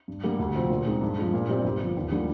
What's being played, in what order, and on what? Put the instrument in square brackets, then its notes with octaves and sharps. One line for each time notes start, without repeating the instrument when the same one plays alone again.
[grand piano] G2
D3 G3 A#3
D2
C3 F3 C4
A#2
G#3 C4 D#4
G2
F3 G#3
A#2
G3 C4 G4 D5
G1
G2 F3
D#2
D3 G3 A#3 F4